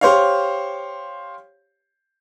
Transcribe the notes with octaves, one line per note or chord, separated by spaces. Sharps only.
G4 C5 C#5 F5